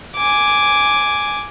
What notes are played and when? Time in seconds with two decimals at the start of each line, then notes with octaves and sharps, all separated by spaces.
0.16 G#5 D6